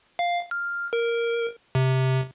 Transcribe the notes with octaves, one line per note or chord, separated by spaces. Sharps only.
F5
F6
A#4
C3